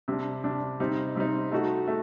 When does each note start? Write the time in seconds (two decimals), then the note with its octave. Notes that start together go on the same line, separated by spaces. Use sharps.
0.08 C3 G3 D4
0.44 C3 G3 D4
0.80 C3 G3 C4 D#4
1.15 C3 G3 C4 D#4
1.52 A3 D#4 F#4
1.87 A3